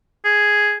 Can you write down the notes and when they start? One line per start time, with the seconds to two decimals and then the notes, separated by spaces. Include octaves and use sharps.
0.25 G#4